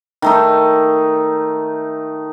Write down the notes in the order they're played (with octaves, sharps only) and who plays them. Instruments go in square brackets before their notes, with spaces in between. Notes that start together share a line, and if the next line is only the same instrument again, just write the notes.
[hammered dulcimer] D#3 A3 D#4